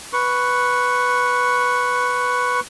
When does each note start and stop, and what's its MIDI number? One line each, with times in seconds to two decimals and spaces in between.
0.13 2.60 71
0.13 2.60 85